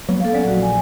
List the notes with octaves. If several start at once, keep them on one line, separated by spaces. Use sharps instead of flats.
F#3 A#3 B3
G#3 A#3 A4 F5
F#3 B3 C#4 D5
A#1 F#3 F#4
G#5